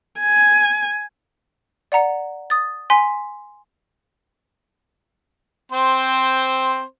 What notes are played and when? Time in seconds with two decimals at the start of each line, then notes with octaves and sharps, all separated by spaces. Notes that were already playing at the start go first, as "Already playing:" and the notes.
0.20 G#5
1.92 D5 F#5 A#5 C#7
2.50 D#6 A6
2.90 G#5 C6 B6
5.72 C4 C5